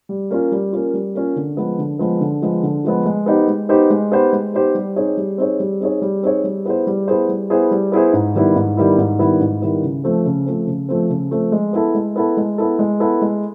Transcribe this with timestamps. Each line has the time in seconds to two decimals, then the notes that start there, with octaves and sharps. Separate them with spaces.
0.09 G3
0.31 A#3 C#4 F4
0.52 G3
0.73 A#3 C#4 F4
0.94 G3
1.15 A#3 C#4 F4
1.36 D3
1.57 F3 G#3 B3
1.79 D3
1.99 F3 G#3 B3
2.21 D3
2.42 F3 G#3 B3
2.63 D3
2.84 F3 G#3 B3
3.05 G#3
3.26 B3 D#4 G4 C5
3.48 G#3
3.69 B3 D#4 G4 C5
3.90 G#3
4.12 B3 D#4 G4 C5
4.33 G#3
4.54 B3 D#4 G4 C5
4.75 G3
4.96 C4 D#4 G#4 C#5
5.17 G3
5.38 C4 D#4 G#4 C#5
5.60 G3
5.81 C4 D#4 G#4 C#5
6.01 G3
6.23 C4 D#4 G#4 C#5
6.44 G3
6.65 B3 E4 G#4 C5
6.87 G3
7.08 B3 E4 G#4 C5
7.29 G3
7.50 B3 E4 G#4 C5
7.71 G3
7.92 B3 E4 G#4 C5
8.13 G#2
8.35 D#3 G3 B3 E4
8.56 G#2
8.77 D#3 G3 B3 E4
8.98 G#2
9.19 D#3 G3 B3 E4
9.40 G#2
9.62 D#3 G3 B3 E4
9.83 C#3
10.04 F3 A3 C4
10.25 C#3
10.46 F3 A3 C4
10.67 C#3
10.89 F3 A3 C4
11.10 C#3
11.31 F3 A3 C4
11.52 G#3
11.73 B3 E4 A4
11.94 G#3
12.16 B3 E4 A4
12.37 G#3
12.58 B3 E4 A4
12.79 G#3
13.00 B3 E4 A4
13.21 G#3